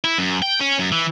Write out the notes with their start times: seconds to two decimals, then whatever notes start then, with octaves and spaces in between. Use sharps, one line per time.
0.04 E4
0.18 F#2
0.42 G5
0.60 C#4
0.79 F#2
0.92 E3